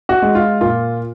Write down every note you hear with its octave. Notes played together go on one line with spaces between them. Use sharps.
F#4
G#3
F4
A#2 F4